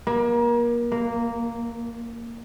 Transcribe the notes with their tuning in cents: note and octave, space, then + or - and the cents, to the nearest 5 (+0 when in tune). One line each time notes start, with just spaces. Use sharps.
A#3 +30
A#3 -5